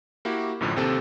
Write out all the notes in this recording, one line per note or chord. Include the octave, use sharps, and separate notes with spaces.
A#3 E4 F#4 G4
A1 F#2 A2 D3 F3
D#2 C3 C4 A4